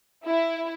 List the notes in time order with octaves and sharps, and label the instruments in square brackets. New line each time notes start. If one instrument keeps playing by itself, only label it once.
[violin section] E4